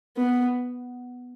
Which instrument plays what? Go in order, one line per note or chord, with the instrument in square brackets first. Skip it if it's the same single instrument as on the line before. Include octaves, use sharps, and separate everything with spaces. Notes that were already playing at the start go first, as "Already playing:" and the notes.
[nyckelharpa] B3